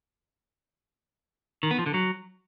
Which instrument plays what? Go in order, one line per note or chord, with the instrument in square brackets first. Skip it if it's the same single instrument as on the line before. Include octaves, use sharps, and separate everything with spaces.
[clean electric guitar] D#3
B3
F3
D3
F#3